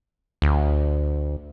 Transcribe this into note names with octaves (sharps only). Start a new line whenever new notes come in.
D2